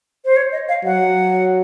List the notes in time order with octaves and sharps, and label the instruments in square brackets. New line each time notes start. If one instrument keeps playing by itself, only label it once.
[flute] C5
C#5
D#5
F5
[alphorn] F#3 [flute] F#5